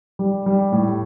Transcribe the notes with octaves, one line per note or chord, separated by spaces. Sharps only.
G3
G3
A2